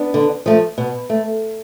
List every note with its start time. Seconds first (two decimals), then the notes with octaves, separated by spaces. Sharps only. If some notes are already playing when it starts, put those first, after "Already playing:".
Already playing: B3 D4
0.14 D3
0.46 F3 A3
0.78 B2
1.10 A3